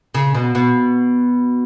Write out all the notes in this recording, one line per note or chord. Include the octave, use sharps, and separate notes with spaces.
C#3
B2
B2